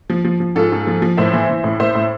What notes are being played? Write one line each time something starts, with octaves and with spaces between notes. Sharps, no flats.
F3
F3
F3
G#2 F4 A4
G#2
F3
F3
A2 C5 E5
E3
E3
A2
A2 C5 E5
A2